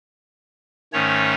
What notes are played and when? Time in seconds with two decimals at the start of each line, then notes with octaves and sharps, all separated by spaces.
0.93 G#2 D#3 A3 C#4 C#5